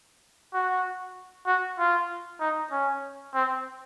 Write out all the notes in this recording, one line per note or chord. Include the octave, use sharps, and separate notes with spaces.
F#4
F#4
F4
D#4
C#4
C4